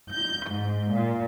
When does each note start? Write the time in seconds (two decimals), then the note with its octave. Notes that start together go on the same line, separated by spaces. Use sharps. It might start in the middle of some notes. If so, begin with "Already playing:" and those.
0.11 G6
0.49 G#2
0.92 A#2